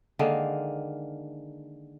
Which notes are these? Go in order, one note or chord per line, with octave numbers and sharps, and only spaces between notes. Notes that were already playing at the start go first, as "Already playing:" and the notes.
D3 D#3 G#3 A#3